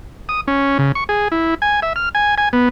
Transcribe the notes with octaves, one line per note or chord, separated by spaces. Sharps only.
D#6
C#4
C#3
C#6
G#4
E4
G#5
E5
F6
G#5
G#5
B3